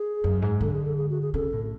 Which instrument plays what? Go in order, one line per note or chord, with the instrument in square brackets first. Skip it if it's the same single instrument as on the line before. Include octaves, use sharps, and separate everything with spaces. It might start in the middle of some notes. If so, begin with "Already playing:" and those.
Already playing: [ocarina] G#4
[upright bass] F#2
G#2
[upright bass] D3 [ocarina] A4
[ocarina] G#4
A4
G#4
F#4
G#4
[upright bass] C#3 [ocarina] A4
[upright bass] A2